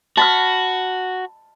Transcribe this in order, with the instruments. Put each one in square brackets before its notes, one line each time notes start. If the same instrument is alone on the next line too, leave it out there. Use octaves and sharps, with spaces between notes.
[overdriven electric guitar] F#4 [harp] A5 B5 F6